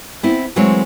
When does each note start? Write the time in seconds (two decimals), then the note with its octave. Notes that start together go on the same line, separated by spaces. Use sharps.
0.23 B3 C4 E4
0.56 E3 F#3 G#3 A3 C4 C#5